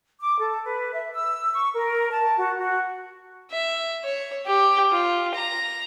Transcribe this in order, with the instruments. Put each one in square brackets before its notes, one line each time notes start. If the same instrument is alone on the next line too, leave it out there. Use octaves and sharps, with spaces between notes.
[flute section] D6
A4
B4
E5
E6
C#6
A#4
A5
F#4
F#4
[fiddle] E5
C#5
G4
F4
A#5